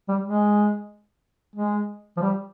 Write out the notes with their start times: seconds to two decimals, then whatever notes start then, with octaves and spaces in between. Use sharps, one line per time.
0.08 G3
0.25 G#3
1.56 G#3
2.17 F3
2.22 G3